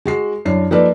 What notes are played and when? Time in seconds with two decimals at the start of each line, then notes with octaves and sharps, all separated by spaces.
0.05 G#3 F#4 C7
0.45 F#2 D4 E4 C#5 C7
0.71 F3 A#3 D#4 A4 B4 D5